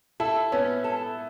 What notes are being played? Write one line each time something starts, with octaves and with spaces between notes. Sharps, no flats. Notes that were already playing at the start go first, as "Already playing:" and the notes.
E4 A4
B3 C#4
A4